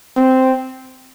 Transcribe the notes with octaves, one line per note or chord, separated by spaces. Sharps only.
C4